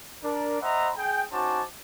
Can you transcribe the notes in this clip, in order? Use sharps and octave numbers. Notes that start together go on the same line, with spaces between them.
D4 A#4
C5 D#5 E5 F#5 A#5 B5
G#4 G5
C#4 D#4 F#4 C5 A5 D6